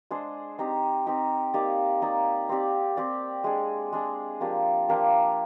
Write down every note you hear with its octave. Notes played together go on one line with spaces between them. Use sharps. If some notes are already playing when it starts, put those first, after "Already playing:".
G#3 D4 G#4 C5
C4 D#4 G4
C4 D#4 G4
A#3 D#4 G4 D5
A#3 D#4 G4 D5
C4 G4 D5
C4 G4 D5
G#3 D4 G#4
G#3 D4 G#4
F3 A#3 D4 G4
F3 A#3 D4 G4